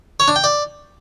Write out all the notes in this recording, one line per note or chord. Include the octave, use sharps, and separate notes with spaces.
C#5
D4
G5
D5